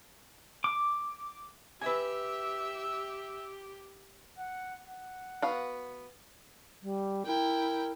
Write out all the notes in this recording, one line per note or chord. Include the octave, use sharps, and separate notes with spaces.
D6
G4 B4 E5 G#5 E6
F#5
F#5
B3 F#4 F5
G3
E4 A#4 G5